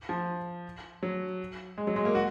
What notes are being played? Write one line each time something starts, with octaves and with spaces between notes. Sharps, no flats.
F3
F#3
G#3
F#3
G#3
A#3
F#4